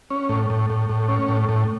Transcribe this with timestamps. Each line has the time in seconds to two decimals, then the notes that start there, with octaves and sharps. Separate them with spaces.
0.10 C#4
0.29 A2
0.50 A2
0.70 A2
0.89 A2
1.08 C#4
1.28 A2
1.49 A2